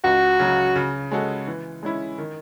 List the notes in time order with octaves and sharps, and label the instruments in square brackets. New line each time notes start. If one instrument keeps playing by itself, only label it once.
[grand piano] C#2 [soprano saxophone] F#4
[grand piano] C#3 F#3
C#3
G#3 C#4 F#4 A4
E3
G#3 C#4 E4
D#3